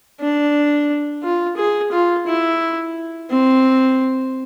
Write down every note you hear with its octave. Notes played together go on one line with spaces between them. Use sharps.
D4
F4
G#4
F4
E4
C4